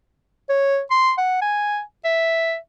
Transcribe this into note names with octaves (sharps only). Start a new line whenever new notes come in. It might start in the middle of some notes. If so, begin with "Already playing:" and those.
C#5
C6
F#5
G#5
E5